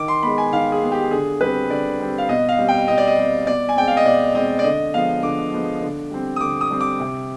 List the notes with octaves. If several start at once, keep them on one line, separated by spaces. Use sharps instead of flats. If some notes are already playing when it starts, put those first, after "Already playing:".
Already playing: D#3 D6
C6
G#3 B3 B5
G#5
D#3 F5
G#4
G#3 B3
G4
D3 G#4
G3 C4 B4
D3 D5
G3 C4
F5
B2 D#5
F5
G3 C4
G5
B2 D#5
D5
D#5
G3 C4
B2 D5
G#5
G#3 C4 G5
F5
D#5
B2 D5
G#3 C4 D#5
D5
D3 D#5
F3 G#3 B3 F5
D3 D6
F3 G#3 B3
D3
G3 C4
D#6
D3 D6
D#6
G3 C4
D6
C3